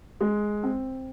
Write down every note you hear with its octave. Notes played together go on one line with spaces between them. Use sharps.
G#3
C4